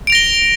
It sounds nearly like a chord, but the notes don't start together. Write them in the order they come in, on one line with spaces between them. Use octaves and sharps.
D7 F7 A#6 G7